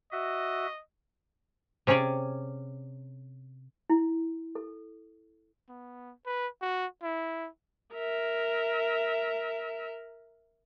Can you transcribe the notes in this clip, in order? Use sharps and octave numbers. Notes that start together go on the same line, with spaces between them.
F#4 D#5 E5
C3 C#4 G#4 C#5 D5
E4
A4
B3
B4
F#4
E4
A#4 E5